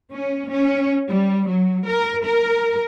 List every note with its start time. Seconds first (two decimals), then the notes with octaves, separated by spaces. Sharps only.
0.12 C#4
0.50 C#4
1.09 G3
1.48 F#3
1.87 A#4
2.26 A#4